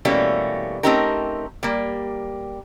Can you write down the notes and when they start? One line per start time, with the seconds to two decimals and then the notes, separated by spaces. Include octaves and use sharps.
0.05 B2 E3 G3 A3 A#3 C#4
0.83 A3 C4 C#4 D#4 G4 A#4
1.63 G3 A#3